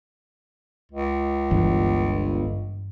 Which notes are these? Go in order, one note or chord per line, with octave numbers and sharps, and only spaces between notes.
C#2
G1 G2 E3